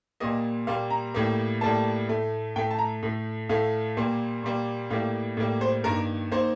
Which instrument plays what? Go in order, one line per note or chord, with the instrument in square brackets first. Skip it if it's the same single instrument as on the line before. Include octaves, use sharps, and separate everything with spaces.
[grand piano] A#2 G3 A#3 D#5
A#2 G3 A#3 F5
A#5
A2 G3 A#3
A2 G3 A#3 A5
A2 A3
A2 A3 G5
A5
A#5
A2 A3
A2 A3 F5
A#2 G3 A#3
A#2 G3 A#3
A2 G3 A#3 F5
A2 G3 A#3
C5
G2 D#3 A#3 A#4
D#3 A#3 C5